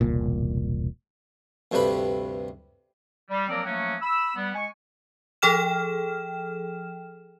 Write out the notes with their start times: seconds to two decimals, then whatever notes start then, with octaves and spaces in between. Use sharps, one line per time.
0.01 E1 C2 A#2
1.72 D2 G2 C3 A3 B4 B5
3.30 G3
3.49 F3 F#3 A#3 C4 A#4 D5
3.64 F3 F#3 A3 A#3 C#4 F#4
4.01 B5 E6
4.36 G3 B3
4.54 G#3 G#5 C#6
5.42 F3 G#4 A4 G5 F6 E7